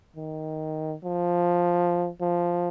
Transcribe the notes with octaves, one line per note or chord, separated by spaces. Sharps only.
D#3
F3
F3